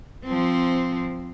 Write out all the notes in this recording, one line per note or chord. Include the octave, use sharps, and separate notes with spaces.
F3 C4